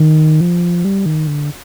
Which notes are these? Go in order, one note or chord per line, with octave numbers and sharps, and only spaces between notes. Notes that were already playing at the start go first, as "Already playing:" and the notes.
Already playing: D#3
F3
G3
D#3
D3